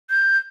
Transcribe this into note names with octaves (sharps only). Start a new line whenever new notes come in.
G6